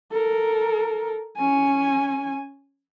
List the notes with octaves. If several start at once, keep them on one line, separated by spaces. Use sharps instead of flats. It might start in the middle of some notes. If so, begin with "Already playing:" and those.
A4 A#4
C#4 G#5